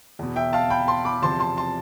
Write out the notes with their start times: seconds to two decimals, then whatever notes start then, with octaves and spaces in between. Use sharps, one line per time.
0.19 E2 B2
0.36 E5 G5
0.53 F5 A5
0.70 G5 B5
0.88 A5 C6
1.05 B5 D6
1.22 E2 C3 F3 A5 C6
1.40 A5 C6
1.57 A5 C6